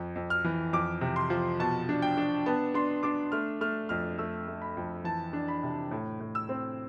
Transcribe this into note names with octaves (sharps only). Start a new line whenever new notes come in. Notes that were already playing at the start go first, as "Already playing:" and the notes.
Already playing: F2
F2
F6
E3
F2 D6
C3
C6
F3
B2 A5
D4
G5
D4
B3 A5
D4 C6
D4 D6
A3 F6
A3 F6
F2 F6
A3 E6
A3
B5
F2
E3 A5
D4
B5
C3
A2
A2
E6
C4